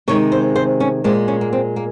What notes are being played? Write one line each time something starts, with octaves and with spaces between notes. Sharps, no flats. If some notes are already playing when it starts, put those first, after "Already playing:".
C3 D#3 G#3 C#5
C5
C5
C#4
A#2 G#3 C4
C#4
A#3
C4
A#3